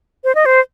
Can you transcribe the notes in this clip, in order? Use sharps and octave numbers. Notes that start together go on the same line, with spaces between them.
C5
D#5
C5